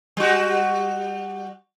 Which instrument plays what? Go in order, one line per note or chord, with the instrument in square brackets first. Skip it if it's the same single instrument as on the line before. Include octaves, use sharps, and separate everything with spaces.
[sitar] G3 F#4